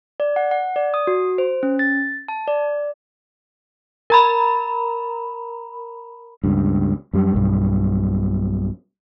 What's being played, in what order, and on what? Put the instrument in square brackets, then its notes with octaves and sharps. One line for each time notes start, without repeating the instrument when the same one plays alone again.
[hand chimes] D5
F#5
F#5
D5
D#6
F#4
C5
C#4
A6
A5
D5
[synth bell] A#4 A#5 B5
[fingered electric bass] C#2 G2
F#2 G3
B1 G2